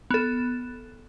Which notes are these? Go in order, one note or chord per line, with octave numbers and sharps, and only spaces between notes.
B3 A4